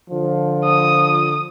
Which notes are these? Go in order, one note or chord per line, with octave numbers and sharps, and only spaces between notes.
D3 F3
D#6